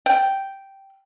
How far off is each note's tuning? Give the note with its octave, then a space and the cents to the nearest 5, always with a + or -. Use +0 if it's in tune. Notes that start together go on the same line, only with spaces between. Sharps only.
G5 -5